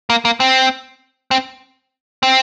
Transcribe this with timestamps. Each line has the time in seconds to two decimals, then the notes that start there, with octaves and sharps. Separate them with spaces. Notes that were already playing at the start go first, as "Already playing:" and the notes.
0.10 A#3
0.25 A#3
0.40 C4
1.31 C4
2.23 C4